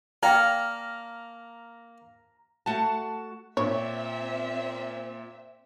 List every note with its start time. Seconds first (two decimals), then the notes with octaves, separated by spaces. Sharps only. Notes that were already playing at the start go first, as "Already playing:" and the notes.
0.23 A#3 D5 F5 G5 A#5 F6
2.66 A3 F#4 F#5 A5
3.57 A#2 C4 C#5 E5